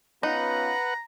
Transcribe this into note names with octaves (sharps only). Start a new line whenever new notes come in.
B3 C#4 D#4 F4 B4 F#5 A#5